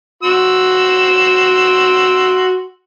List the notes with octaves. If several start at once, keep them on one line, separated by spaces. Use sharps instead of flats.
F#4 C6 E6